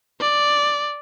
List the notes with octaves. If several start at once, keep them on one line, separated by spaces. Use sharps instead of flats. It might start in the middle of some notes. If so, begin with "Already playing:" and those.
D5